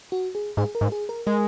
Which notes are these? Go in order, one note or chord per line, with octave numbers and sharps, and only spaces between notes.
F#4
G#4
G#2 G#4
A#4
G#2
G#4
A#4
G#3 A#4